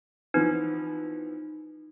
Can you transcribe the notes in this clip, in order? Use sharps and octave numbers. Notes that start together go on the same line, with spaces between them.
E3 F3 B3 D#4